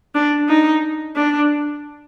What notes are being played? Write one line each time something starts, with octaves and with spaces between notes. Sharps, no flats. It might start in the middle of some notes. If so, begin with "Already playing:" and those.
D4
D#4
D4